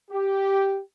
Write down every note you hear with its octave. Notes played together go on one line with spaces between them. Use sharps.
G4